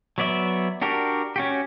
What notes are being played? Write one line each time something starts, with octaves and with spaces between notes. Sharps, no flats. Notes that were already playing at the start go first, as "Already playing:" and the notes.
F#3 B3 D5 E5
D4 F#4 G4 A#4
C#4 F#4 G4